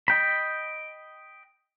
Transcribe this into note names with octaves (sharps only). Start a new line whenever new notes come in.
D#5 G5 B5